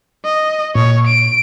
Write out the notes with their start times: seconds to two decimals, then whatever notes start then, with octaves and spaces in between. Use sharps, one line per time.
0.25 D#5
0.75 A#2 C#5
1.07 D7